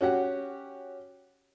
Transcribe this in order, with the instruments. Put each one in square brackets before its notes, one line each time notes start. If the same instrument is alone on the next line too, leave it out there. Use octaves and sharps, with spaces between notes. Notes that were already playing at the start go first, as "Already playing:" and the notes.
[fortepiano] C#4 F#4 G4 F#5